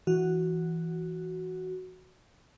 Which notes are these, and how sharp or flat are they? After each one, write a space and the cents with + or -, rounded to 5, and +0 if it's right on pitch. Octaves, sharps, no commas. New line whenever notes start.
E3 +5 F#4 +0